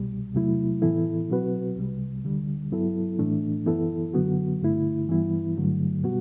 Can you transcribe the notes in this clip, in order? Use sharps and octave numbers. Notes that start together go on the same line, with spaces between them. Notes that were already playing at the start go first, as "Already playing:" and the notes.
Already playing: C2 B2 G3
E2 C3 F#3 A3 E4
A2 E3 B3 E4 A4
B2 F#3 C4 F#4 B4
C2 C3 G3
D2 D3 G3
G2 F#3 B3 E4 A4
A2 E3 A3 D4
F#2 E3 B3 E4 A4
F#2 D3 F#3 B3 F#4
G2 D3 A3 E4
G2 E3 G3 B3 E4
G2 D3 F#3 A3
B2 G3 B3 F#4